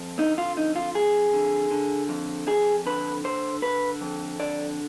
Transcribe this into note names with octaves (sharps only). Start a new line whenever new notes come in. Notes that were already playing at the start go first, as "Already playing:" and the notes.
Already playing: F2
D3 D#4
F4
F2 D#4
F4
F2 G#4
D3
D3
F2
F2 G#4
D3 B4
D3 C5
D3 B4
F2
D3 D5